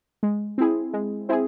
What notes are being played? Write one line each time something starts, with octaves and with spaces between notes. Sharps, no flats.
G#3
C4 E4 G#4
G#3
C4 E4 G#4